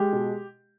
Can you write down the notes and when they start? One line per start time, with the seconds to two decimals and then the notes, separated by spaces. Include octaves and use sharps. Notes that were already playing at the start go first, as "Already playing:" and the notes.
Already playing: G#3 G4
0.13 B2